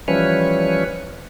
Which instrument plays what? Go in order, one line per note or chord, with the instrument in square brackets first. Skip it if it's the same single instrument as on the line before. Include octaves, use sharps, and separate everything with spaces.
[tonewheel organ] E3 F3 G3 C#4 B4 C#5